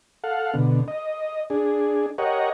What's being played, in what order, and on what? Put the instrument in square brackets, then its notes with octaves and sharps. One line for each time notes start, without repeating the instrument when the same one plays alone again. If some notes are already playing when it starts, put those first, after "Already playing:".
[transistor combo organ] A4 F5 F#5
B2 D3
D#5
D4 G#4
G4 A#4 C#5 D#5 F#5